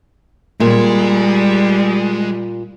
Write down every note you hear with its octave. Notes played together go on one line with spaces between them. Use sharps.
A#2 G3 G#3